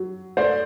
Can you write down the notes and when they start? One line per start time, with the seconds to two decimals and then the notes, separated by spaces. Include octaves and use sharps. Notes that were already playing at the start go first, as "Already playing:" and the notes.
Already playing: F#3
0.37 A3 C5 D5